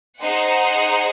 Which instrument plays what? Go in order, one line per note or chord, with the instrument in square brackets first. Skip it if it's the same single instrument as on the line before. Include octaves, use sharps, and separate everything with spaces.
[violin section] D#4 G#4 C5 F#5